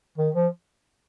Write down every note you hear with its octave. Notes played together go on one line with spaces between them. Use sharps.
D#3
F3